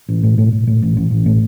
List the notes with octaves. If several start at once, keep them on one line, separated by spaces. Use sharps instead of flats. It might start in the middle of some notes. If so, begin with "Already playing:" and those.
A1
A2
A2
A2
A2
A1
A1
A1
A2